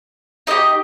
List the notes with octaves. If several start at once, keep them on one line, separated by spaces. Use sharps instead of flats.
D#4 G4 D#5